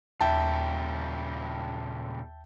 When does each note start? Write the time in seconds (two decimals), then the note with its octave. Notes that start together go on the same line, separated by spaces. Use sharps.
0.21 D#2 A#2 C#3 G3 E5 G5 A5